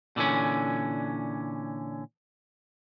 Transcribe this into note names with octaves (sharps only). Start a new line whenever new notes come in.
A#2 D3 E3 C#4